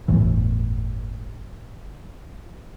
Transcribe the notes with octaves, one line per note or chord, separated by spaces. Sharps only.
G1 E2 A2 E3